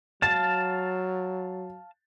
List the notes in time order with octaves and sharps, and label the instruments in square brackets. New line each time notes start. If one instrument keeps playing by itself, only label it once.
[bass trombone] F#3 [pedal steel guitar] F5 A5 [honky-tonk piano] A6